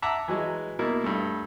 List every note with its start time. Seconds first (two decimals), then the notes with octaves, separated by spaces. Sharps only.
0.02 E5 F#5 A5 A#5 D6
0.28 E3 F#3 G#3
0.79 B2 A#3 E4
1.04 G2 A3